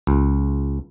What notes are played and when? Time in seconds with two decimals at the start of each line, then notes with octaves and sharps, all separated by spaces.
0.07 C#2